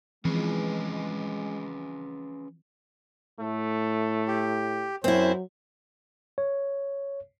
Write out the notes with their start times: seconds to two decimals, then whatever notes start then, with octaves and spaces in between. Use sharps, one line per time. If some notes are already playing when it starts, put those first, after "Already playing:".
0.25 E3 F3 G#3 C4 C#4 G#4 B4
3.40 A2 A3
4.28 G4
5.04 F#2 F#3 C4 E4 C5
6.38 C#5